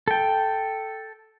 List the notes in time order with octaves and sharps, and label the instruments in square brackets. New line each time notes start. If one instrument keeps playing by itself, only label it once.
[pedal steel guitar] A4 G5